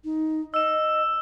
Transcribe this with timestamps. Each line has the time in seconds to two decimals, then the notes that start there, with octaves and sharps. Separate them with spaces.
0.05 D#4
0.54 D#5 E6 E7